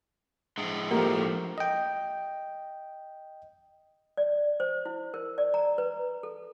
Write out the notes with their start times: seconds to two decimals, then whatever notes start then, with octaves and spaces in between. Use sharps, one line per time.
0.58 A2 F3 G#3 D4
0.91 F3 A3 A#3 D4 G4 A#4
1.58 D#5 G5
4.17 D5
4.60 C5
4.86 E4
5.14 A#4
5.38 D5
5.54 A#5
5.78 B4
6.23 A4